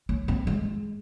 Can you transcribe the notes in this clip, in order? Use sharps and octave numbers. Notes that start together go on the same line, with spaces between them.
C#4
C4
G#3